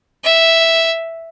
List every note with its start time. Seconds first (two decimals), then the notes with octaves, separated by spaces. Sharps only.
0.25 E5